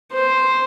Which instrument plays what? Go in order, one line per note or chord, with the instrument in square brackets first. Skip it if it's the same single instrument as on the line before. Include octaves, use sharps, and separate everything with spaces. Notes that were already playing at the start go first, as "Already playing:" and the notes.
[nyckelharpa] C5